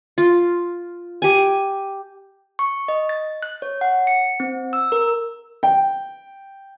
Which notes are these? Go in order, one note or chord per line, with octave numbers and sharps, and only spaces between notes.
F4
G4 G#5
C#6
D#5
A6
F#6
C#5
F#5
C#7
C4
E6
A#4
G5